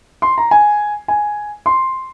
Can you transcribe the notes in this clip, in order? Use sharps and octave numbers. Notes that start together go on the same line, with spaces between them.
C6
A#5
G#5
G#5
C6